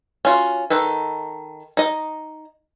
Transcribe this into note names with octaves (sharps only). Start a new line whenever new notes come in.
C#4 F4 F#4
D#3 D#4 A4 B4
D#4 D#5